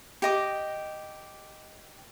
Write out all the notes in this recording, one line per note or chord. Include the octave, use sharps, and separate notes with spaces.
G4 D#5 D6